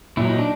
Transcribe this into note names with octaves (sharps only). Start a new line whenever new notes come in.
A#2 F#3 E4
D#4
D4